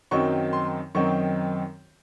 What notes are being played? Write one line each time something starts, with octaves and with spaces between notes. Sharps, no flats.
F#2 D#3 F#3 C4 D#4 C#6
C6
F#2 D#3 F#3 C4 D#4 C#6